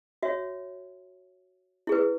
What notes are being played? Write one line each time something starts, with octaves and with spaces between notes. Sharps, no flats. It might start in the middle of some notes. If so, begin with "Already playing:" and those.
F#4 C#5 E5
E4 G#4 B4